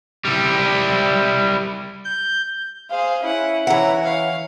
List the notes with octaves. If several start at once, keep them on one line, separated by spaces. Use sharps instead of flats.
G3 E4
G6
G#4 C5 F5
C#4 E4 F#5
E3 C#5 F#5 A#5
C#5 F5